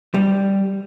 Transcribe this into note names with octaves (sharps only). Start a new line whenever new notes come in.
G3